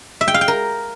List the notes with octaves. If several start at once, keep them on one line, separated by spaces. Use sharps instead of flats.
E5
G5
F5
G5
A#4